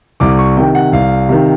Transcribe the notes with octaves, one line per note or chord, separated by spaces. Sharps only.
C2 D6
C#6
C3 D#3 G5
F#5
C2 F5
C3 D#3